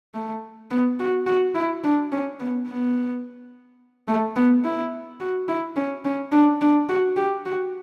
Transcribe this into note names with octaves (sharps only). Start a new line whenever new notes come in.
A3
B3
F#4
F#4
E4
D4
C#4
B3
B3
A3
B3
E4
F#4
E4
C#4
C#4
D4
D4
F#4
G4
F#4